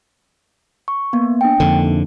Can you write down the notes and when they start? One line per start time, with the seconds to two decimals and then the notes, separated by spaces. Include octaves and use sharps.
0.88 C#6
1.13 A#3 B3
1.41 D4 G5
1.60 F2 D3 A#3 D#4